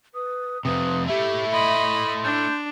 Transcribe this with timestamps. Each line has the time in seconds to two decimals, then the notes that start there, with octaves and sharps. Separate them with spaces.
0.15 B4 D#6
0.65 F2 C3 B4 D#6
1.08 A3 E4 G4 E5
1.53 D#5 B5 C6
2.24 D4 G6